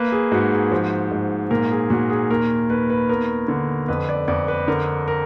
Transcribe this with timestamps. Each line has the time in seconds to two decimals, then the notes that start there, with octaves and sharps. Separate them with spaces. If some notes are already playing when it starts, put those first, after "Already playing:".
Already playing: A#3 B4
0.12 G#4
0.32 G#2 F#4
0.52 G#4
0.71 F3 F#4
1.11 G#2
1.51 A#2 A#4
1.71 G#4
1.90 A#2 F#4
2.10 G#4
2.30 D#2 A#4
2.70 D#2 B4
2.90 B4
3.09 B3 A#4
3.48 D3
3.88 F2 B4
4.09 D5
4.28 F2 D5
4.48 B4
4.68 D3 A#4
5.08 A#4